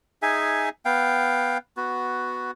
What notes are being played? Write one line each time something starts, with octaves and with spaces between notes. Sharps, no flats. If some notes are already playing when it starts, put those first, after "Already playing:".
D#4 G#4 E5 G#5
B3 F5 G5
B3 F#4